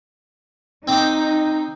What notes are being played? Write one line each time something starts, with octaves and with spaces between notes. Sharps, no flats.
C4 D#4 G5 D6